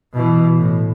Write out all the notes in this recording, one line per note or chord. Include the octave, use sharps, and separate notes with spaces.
B2 E3
A2